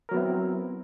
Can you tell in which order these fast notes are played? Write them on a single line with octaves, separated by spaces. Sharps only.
A#4 F#3 B3 E4 C4